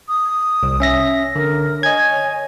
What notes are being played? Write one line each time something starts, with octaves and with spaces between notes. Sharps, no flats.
D#6
C2
C#4 E5 A#6
D3 A#4
C#5 D#5 G#5 G#6